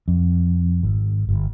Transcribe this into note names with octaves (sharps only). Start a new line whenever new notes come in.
F2
G#1
G1